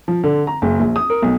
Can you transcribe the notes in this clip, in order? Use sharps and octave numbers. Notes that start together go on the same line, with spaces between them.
F3
D3
A#5
F#1
A#1
D#6
A#4
B1